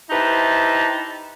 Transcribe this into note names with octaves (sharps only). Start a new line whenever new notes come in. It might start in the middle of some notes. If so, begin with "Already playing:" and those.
D#4 E4 G4 B4 C5 A5